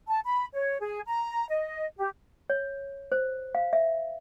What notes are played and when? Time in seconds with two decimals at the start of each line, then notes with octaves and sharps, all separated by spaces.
0.07 A5
0.26 B5
0.54 C#5
0.80 G#4
1.07 A#5
1.49 D#5
1.98 G4
2.50 C#5
3.12 C5
3.55 F5
3.73 E5